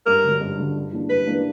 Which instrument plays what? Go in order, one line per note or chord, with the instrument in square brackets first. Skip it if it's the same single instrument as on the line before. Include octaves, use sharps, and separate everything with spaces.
[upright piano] G2 [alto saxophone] A#4
[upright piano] D3 F#3
G2
D3 F#3
G2
E3 A#3 D4
[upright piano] G2 [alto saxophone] B4
[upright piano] E3 A#3 D4